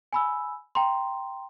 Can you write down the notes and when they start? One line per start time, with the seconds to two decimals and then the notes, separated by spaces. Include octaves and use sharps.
0.13 G#5 B5 E6
0.75 G5 A#5 C6